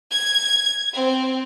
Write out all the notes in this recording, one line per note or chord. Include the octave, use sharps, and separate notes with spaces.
G#6
C4